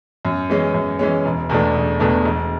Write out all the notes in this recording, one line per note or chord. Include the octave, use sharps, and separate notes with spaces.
F#2
E3 G#3 C#4
F#2
E3 G#3 C#4
E1
E2 B2 A3 D4
E1
E2 B2 A3 D4
E1